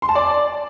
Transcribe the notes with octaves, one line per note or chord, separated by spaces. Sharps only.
C6
A5
D5